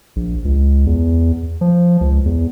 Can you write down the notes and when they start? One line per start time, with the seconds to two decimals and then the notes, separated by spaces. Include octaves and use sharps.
0.16 A#1
0.45 C#2
0.86 E2
1.61 F3
2.01 C#2
2.26 E2